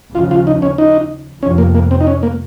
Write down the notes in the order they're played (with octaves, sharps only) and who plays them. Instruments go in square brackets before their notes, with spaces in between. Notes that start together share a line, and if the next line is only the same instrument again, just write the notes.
[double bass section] D#2 C#3 F3 [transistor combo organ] F4
[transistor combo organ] F4
D#4
C#4
D#4
[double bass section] F2 C3 F3 [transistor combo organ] C#4
[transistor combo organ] A#3
A#3
C4
D#4
C#4
A#3